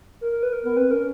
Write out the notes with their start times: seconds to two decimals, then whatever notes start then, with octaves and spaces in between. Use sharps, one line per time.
0.21 A#4
0.32 A#4
0.43 B4
0.53 A#4
0.63 B3 A#4
0.77 C4 B4
0.91 C#4 A#4